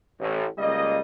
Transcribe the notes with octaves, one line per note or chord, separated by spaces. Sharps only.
A1
C#2 G3 A#3 D#5